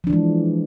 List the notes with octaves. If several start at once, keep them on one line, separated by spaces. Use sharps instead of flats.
E3 F3 G#3 D4